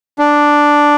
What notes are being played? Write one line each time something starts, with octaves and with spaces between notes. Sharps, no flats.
D4